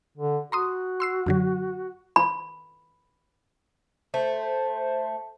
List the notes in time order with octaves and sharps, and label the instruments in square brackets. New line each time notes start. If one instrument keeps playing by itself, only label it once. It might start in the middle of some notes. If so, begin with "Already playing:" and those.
[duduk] D3
[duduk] F#4 [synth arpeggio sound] A#5 C6 D#6
[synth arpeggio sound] C6 E6 C7
F#2 D3 F#3
[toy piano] B5
[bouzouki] A3 [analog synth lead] C5